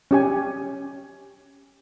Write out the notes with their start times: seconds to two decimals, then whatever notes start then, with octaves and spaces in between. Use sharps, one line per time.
0.11 C#4 G4 G#5